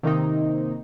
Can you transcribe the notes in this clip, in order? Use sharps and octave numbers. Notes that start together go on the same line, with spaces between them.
C3 D#3 A#3 C4 D#4